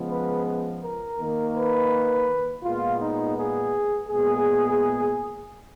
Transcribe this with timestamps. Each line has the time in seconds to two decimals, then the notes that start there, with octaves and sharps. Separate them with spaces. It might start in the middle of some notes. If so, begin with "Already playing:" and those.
Already playing: C#3 F3 G#3 B3
0.10 B4
0.83 A#4
1.19 D#3 A#3
1.55 B4
2.64 A#2 G#3 B3 F4
3.00 D#4
3.36 G#4
4.09 A#2 G#3 B3 G#4